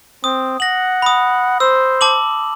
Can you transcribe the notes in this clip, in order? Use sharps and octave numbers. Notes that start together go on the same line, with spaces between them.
C4 D#6
F#5 A#6 F#7
B5 D#6
C5 E6
A5 D6 F#7